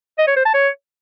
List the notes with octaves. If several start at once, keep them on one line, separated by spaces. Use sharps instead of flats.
D#5
C#5
C5
A5
C#5